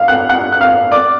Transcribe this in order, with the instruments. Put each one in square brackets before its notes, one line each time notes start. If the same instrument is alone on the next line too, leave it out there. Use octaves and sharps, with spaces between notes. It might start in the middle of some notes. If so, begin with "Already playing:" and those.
Already playing: [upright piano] F5 F6
F#5 F#6
F#5 F#6
F#6
F5 F6
D5 D6